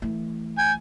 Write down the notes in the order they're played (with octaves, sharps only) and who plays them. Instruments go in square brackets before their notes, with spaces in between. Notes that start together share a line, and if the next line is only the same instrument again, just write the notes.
[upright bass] E3 A3
[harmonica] G#5 [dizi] G6